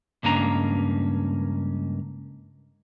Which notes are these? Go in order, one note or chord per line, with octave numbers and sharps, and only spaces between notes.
C#2 G2 A#3 C#4 D4 A#5